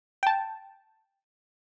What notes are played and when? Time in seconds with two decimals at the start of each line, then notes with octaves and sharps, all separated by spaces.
0.23 G5 A5